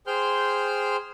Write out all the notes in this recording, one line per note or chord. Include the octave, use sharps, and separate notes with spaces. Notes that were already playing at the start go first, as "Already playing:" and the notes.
G#4 C5 G5 C6 F6 G6